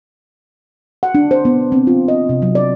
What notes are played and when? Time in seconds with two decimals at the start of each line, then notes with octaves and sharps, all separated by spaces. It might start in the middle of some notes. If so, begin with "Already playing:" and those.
1.03 F#5
1.15 D4
1.31 C5
1.45 B3
1.72 C4
1.87 F4
2.08 D#5
2.29 C3
2.42 F#3
2.55 D5